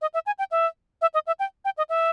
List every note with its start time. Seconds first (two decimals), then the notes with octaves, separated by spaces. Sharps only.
0.02 D#5
0.14 E5
0.26 G#5
0.39 G5
0.51 E5
1.02 E5
1.14 D#5
1.27 E5
1.40 G5
1.65 G5
1.78 D#5
1.89 E5